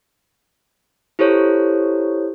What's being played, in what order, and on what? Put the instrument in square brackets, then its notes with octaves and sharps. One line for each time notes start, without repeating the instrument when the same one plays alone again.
[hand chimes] E4 G4 A4 C5 C#5